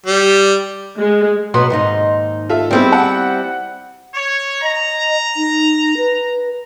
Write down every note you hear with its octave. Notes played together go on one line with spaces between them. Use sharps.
G3
G#3
B2 F#3 B3 C6
D#2 G#2 D#4
F4 A4 E5
G3 B3 C4 E4 G#4 C5
F#5
C#5
D#5 A#5
D#4
B4